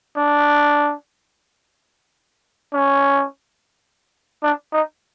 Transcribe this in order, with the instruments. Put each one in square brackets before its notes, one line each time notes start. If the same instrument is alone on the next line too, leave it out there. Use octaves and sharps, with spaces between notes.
[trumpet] D4
C#4
D4
D#4